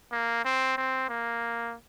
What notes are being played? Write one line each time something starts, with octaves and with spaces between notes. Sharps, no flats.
A#3
C4
C4
A#3